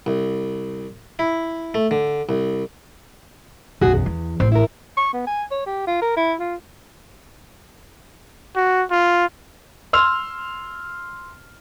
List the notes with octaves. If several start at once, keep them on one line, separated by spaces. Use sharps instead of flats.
C2
E4
A3
D3
C2
B1 F#2 F#4 G#4
E2
E3
A1 C4
E4 A#4
C#6
B3
G#5
C#5
G4
F4
A#4
E4
F4
F#4
F4
C6 E6 F6 F7